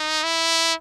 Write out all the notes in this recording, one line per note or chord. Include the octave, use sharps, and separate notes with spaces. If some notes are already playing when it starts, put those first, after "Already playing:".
Already playing: D#4
E4